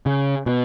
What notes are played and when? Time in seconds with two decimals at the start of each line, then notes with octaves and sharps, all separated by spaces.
0.06 C#3
0.46 B2